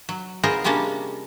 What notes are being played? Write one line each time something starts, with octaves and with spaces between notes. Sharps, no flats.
F#3
B3 F4 G#4 A#4 C5 D#5
C3 G3 G#3 A#3 C#4 D4